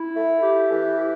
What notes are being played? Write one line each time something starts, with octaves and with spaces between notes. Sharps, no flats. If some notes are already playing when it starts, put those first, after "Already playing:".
Already playing: E4
A3
G4
E3
E4